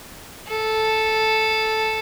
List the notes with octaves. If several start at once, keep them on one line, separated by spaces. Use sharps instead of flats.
A4